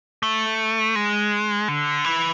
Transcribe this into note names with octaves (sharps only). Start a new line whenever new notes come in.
A3
G#3
D3
E3